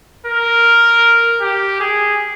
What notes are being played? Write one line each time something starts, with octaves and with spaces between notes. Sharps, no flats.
A#4
G4
G#4